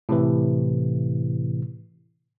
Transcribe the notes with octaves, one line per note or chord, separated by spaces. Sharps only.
A2 C3 E3